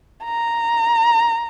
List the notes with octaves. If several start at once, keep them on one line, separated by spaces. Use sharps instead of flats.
A#5